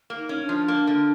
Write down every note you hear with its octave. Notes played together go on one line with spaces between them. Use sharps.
A#3
D#4
C#4
D4
F3
A#3
D3